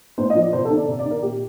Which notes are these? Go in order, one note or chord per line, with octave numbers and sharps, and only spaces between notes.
A2 C5
D#5
F3
D5
C3 C5
A4
D#3
D5
C3 D5
D5
D#3
A#4
A#2 G4